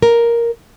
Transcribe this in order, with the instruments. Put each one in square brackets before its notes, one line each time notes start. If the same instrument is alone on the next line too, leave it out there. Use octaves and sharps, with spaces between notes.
[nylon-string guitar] A#4